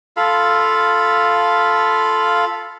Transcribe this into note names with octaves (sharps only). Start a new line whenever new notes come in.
F4 A4 F5 B5